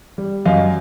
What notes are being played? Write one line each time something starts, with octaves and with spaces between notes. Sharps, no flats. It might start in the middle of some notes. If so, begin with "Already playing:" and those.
G3
F#2 D#5 F5